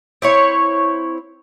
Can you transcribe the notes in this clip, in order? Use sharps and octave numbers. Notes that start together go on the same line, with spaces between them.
C4 E4 C#5